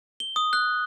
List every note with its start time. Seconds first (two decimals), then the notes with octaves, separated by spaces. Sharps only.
0.20 G7
0.36 D#6
0.53 F#6